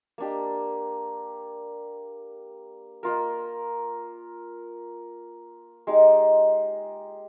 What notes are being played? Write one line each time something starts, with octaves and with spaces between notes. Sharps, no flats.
A#3 D4 G4
A#3 F4 A#4
G#3 D#4 G4